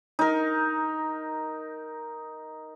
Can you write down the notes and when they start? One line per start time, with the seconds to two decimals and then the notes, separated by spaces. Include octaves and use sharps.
0.19 D#4 A#4